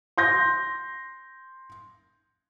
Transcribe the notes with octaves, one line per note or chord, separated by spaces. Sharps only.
C6 G6 A#6